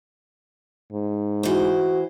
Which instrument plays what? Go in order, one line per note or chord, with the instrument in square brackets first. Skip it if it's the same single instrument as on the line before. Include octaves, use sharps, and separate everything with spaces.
[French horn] G#2
[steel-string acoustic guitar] E3 C5 [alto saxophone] F#4